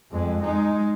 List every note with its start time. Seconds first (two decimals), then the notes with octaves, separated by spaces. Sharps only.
0.12 F2 G#3
0.42 G#3 D#4